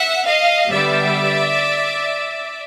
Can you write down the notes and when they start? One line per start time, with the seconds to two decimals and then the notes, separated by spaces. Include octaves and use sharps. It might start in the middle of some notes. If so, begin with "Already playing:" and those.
Already playing: E5 F#5
0.25 D#5 F5
0.70 D3 G3 B3 D5 E5